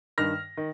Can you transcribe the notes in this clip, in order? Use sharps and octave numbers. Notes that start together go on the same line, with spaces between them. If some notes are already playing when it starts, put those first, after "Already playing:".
G2 D#3 F6 A#6
D#3